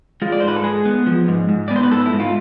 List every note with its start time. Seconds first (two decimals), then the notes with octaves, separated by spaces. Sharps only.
0.22 G#3 F4
0.32 D5
0.40 G#2 C5
0.48 B4
0.56 A4
0.63 G#3 G#4
0.85 B3
1.07 F3
1.28 G#2
1.49 G#2
1.68 D5
1.71 B3
1.76 C5
1.83 B4
1.92 G#2 A4
2.06 E4
2.13 G#2
2.20 F4